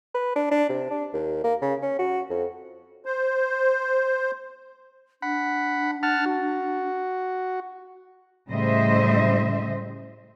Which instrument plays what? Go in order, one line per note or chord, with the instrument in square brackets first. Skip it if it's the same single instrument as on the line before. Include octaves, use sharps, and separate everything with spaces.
[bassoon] B4
D4
D4
C3
D4
D#2
A#3
C#3
C#4
F#4
F2
[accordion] C5
[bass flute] D4 [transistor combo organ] F#5 B5
[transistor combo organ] F#5 A5 F6
F#4
[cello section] A2 C#3 G3 C5 D#5 E5